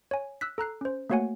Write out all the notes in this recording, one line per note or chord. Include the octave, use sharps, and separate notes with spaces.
C#5 G#5
E6 F#6 B6
A4 A#5 F#6 C7
C#4 C5
A3 A#3 F#4 C#5 F#5 G#5